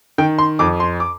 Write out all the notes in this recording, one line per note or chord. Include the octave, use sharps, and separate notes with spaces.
D#3 G5
C6
F2 D6
C6
D6